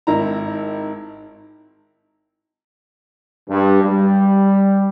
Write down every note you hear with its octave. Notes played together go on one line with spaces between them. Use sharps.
G#1 E4 A#5
G2
G3